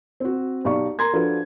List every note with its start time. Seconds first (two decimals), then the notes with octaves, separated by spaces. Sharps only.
0.20 C4 F#4
0.65 B1 D#4 G4 D5 F5 C#6
0.99 A#4 A#5 C6 G#6
1.13 F3 D4 F4 F#4 A4 B4